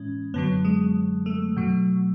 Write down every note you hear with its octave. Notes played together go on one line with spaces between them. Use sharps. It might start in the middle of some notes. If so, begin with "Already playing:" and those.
Already playing: A2 E3 G#3 C#4
F#2 D3 F#3 B3
G#3
A3
B2 F#3